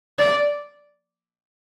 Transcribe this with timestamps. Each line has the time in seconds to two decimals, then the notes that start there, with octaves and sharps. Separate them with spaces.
0.19 D5